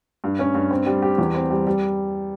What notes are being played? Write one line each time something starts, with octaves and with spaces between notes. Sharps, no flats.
G2
C#4
G2
C4
G3
G4
E2
C4
G3
G3